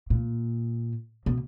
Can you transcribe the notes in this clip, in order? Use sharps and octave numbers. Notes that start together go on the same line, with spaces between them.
A#2
B2